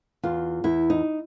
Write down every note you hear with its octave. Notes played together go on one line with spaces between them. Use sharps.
E2 F4
E2 E4
D#4